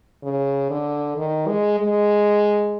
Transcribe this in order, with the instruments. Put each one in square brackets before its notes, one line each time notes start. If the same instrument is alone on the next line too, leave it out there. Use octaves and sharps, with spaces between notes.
[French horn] C#3
D3
D#3
G#3
G#3